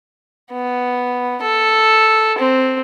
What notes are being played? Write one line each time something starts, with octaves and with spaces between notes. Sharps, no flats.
B3
A4
C4